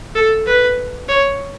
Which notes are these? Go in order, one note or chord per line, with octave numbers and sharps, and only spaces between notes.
A4
B4
C#5